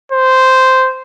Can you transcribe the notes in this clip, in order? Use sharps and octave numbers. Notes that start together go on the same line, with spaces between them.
C5